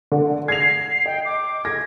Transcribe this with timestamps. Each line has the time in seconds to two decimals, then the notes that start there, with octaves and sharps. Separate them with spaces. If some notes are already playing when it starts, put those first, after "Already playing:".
0.12 D3
0.48 G#6 A#6 C7 F7
1.06 D#5 G5
1.25 D6
1.65 G#6 A#6